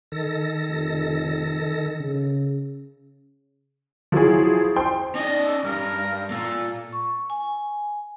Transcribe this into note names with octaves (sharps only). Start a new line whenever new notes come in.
D#3 A4 A#6
F1
C#3
F3 F#3 E4 G#4
C5 G5 C6
C#4 D5 D#5
A4
G2 A#4
A#2 A#3 A4
C#6
G#5